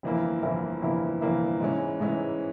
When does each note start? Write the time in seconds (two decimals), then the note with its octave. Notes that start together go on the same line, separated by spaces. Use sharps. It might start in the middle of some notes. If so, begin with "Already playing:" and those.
0.03 G1 F2 E3 A#3 E4
0.43 G1 F2 E3 A#3 E4
0.82 G1 F2 E3 A#3 E4
1.21 G1 F2 E3 A#3 E4
1.60 G#2 E3 G#3 C#4 E4
2.00 G#2 E3 G#3 C#4 E4